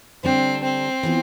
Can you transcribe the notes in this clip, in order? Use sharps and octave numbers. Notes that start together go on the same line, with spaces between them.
D3 G3 C4 D4
C4
E3 B3 F4